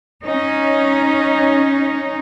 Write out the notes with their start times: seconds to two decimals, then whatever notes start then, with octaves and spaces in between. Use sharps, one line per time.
0.24 C#4 D#4